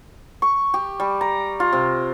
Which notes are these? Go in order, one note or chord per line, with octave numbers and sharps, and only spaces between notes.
C#6
G4
G3
A#5
F4
C3